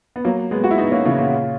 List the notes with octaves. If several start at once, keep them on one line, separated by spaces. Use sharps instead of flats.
B3
F#3 A#3
G#3 B3
F#4
E4
B3 D#4
A#3 C#4
C#3 E3
A#2 C#3